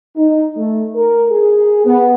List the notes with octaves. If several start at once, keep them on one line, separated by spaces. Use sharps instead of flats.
D#4
A3
A#4
G#4
B3